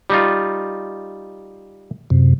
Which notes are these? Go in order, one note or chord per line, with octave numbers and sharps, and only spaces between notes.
G3 D#4 F4
F#2 C3